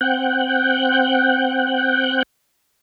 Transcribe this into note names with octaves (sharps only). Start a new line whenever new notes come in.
C4 F#5 G5 F#6 G6